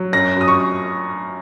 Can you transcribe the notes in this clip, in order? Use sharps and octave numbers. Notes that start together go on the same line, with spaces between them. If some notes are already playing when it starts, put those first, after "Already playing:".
Already playing: F#3
F#2 A#6
F#2 D#6
C#6